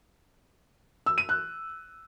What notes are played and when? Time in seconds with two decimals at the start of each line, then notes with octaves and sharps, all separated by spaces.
1.06 E6
1.18 D#7
1.29 F#6